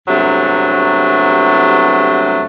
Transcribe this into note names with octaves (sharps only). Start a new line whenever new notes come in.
E2 G2 C3 F#3 A3